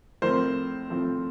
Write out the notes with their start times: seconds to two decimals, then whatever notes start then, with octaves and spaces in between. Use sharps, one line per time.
0.22 A2 F3 A3 C4 A#4 C5
0.89 A2 F3 A3 C4